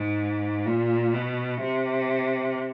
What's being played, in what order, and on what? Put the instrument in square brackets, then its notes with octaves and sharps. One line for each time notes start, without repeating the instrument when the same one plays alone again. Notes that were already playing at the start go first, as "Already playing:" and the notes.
Already playing: [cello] G#2
A#2
B2
C3